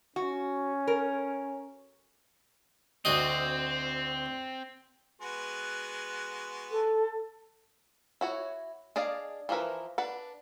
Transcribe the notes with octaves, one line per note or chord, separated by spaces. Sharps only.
C#4 F#4
A#4
D2 C4 F#4 D#5
G#3 B3 F#4
A4
E4 F#4 C#5
D4 G#4 D5 D#5 F5
E3 F3 E4 A#4 B4
D4 B4 F#5